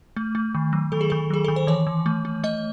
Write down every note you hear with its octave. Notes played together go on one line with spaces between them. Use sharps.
A3
A3
D#3
F#3
D#3 A4
G#4
D#3 A4
F#3 G#4
D#3 A4
C5
E3 C#5
E3
A3
A3
A3 D#5